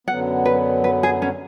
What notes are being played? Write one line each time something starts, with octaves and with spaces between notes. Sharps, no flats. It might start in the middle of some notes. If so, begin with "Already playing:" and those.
F#2 D3 F#3 B3 F#5
B4
B4
G#4
C#4